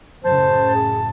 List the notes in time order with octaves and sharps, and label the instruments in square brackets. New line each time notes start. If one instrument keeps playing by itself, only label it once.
[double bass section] F#2 A2 C#3 [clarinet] C5 [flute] A5
[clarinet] G#4